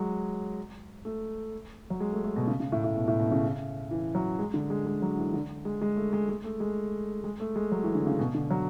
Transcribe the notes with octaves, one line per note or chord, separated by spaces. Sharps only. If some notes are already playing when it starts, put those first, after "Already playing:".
Already playing: F#3 G#3
A3
F#3
G#3
A3
A3
B2
C#3
C#3
A2
A2
B2
A2
B2
C#3
E3
F#3
G#3
D3
G#3
G#3
F#3
E3
D3
G#3
G#3
A3
G#3
G#3
A3
G#3
G#3
A3
G#3
F#3
E3
D3
C#3
B2
D3
F#3